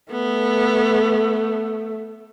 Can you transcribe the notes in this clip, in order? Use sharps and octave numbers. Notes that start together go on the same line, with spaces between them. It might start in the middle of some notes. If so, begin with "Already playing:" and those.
A3 B3